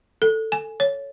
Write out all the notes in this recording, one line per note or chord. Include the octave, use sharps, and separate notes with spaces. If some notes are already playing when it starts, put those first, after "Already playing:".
A4
G#5
C#5